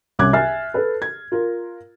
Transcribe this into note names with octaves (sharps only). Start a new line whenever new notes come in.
C2 C#4 D6 F#6 G#6
E5 G#5 F6 A6 C7
A4 B4
G#6
F4 A#4